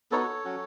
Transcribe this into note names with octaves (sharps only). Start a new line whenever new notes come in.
B3 D#4 F#4 A4 C#5
F#3 C#4 F#4